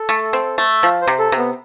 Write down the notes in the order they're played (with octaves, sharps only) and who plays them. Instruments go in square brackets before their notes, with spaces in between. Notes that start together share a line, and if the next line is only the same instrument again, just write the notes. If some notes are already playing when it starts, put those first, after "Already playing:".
Already playing: [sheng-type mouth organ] A4
[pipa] A3
C4
A3
F3
[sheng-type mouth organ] C5
[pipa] C3
[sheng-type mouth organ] A4
[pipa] C3
[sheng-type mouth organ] B3